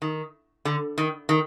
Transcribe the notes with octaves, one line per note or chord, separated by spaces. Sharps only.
D#3
D3
D#3
D#3